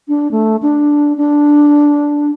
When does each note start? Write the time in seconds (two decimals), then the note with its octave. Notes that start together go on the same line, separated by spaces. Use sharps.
0.08 D4
0.31 A3
0.62 D4
1.17 D4